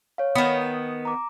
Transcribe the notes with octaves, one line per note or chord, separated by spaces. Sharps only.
C#5 F5
D#3 B3 D#6
A#5 D6